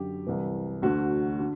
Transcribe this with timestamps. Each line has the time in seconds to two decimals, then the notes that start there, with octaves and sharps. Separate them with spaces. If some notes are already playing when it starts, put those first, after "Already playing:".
Already playing: F#2 D3 G4
0.26 C2 C3 E3
0.82 D2 D3 F#4
1.40 D3